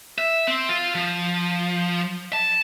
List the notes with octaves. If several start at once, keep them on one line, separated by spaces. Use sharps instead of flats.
E5
C4
F4
F3
A5